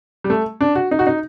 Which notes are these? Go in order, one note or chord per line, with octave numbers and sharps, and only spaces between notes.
G3
A3
D4
F#4
D#4
F#4
D#4